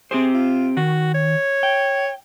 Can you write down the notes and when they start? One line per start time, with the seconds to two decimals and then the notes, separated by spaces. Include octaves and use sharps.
0.11 C4 G4 G#4 C5
0.34 F4
0.77 D#3 F#4
1.14 C#5
1.63 G5